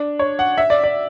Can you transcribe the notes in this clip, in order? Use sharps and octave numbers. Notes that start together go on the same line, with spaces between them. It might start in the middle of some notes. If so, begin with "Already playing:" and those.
Already playing: D4
C#5
F#5
E5
D5
D5